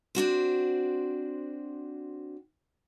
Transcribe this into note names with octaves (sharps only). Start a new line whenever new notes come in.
C4 D4 F#4 C5